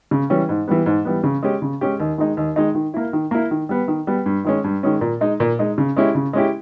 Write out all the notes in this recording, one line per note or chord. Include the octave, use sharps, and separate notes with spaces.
C#3
E3 G3 C#4
G#2
E3 G3 B3
G#2
E3 G3 B3
C#3
G#3 C#4 G4
C#3
G#3 C#4 G4
D#2
D#3 G#3 D#4
D#2
D#3 G#3 D#4
D#3
A#3 E4
D#3
A#3 E4
D#3
G3 B3
D#3
G3 B3
G2
D#3 G#3 C#4
G2
D#3 G#3 C#4
A#2
G#3 D#4
A#2
G#3 D#4
C#3
G#3 C#4 E4 G4
C#3
G#3 C#4 E4 G4